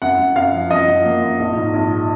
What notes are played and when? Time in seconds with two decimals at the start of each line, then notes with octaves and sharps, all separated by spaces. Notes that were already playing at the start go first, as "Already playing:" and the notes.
0.02 F#2 F#5
0.19 F#2
0.36 F#2 F5
0.53 F3
0.70 F#2 D#5
0.88 F3
1.05 A#3
1.22 F#2
1.39 A#1
1.57 G#2
1.74 A#1